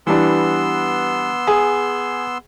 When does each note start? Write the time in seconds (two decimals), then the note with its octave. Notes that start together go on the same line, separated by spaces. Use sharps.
0.07 E3 G3 B3 D4 C6 E6
1.47 G#4